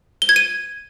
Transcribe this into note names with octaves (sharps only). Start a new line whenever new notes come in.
G7
G#6
D#7